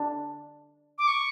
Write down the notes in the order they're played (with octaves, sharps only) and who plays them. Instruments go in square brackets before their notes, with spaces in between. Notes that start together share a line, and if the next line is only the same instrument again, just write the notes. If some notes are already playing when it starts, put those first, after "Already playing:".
Already playing: [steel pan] D4
[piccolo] D6
C#6